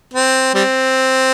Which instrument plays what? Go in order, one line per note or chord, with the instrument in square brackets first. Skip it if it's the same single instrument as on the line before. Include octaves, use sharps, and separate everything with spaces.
[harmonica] C4
G3 C4